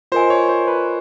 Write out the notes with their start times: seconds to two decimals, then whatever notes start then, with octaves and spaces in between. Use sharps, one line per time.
0.12 F4 A#4 C5 D#5 G#5
0.30 C#5
0.49 C5
0.68 B4